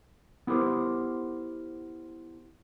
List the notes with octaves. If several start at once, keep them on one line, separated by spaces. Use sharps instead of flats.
B3 E4 G4 A#4 C5